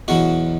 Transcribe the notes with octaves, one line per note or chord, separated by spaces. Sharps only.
E2 B2 F#3 F#4